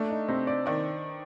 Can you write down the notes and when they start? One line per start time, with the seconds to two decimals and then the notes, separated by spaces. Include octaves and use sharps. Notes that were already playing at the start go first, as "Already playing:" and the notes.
Already playing: A3 D4
0.10 D#4
0.28 C3 C5
0.47 D5
0.66 D#3 D5